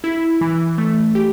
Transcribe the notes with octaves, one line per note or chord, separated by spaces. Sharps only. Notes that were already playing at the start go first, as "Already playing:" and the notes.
E4
E3
A3
G4